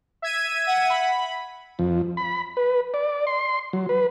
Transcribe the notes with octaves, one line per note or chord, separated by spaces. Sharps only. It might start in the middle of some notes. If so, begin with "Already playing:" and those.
E5 G#6 D#7
F#5
B5
F2
B5
B4
D5
C6
F#3
B4